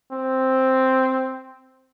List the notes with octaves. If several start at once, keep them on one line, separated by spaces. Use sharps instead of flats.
C4